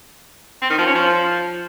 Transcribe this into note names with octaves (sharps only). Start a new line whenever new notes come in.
C4
D#3
F3
C#4
F3